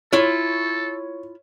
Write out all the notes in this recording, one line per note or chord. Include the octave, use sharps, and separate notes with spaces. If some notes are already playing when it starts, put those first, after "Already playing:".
E4 F4 A4 C#5